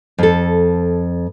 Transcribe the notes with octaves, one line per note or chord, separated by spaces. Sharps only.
F2 A4